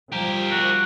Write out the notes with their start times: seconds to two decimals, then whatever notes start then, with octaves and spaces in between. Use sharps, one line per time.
0.12 F3 G3 G4 A#4
0.51 F#4